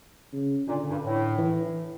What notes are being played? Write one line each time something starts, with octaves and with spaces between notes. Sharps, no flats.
C#3
A#2 D3
G2
A2
E3